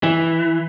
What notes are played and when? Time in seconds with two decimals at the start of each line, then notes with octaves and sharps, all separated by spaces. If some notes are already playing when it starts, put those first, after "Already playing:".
0.03 E3